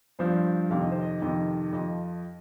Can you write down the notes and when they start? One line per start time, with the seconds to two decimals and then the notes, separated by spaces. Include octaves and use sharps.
0.19 G2 F3 C5
0.70 F2 C3 D#3 F5
0.81 D#5
0.91 C5
1.01 D#5
1.22 F2 C3 D#3 D#5
1.73 F2 F3 D#5